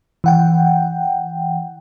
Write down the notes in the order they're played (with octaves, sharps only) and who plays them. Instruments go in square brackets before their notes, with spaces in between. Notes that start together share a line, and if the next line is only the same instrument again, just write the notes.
[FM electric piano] E3 F#5 G5